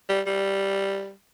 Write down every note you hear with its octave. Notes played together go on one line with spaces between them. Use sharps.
G3
G3